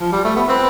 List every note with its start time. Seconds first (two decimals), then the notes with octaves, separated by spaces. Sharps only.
0.01 F3
0.12 G3
0.25 A3
0.36 B3
0.48 C4 B4